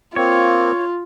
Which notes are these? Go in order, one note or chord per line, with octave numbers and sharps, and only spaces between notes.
A#3 C4 F4 C#5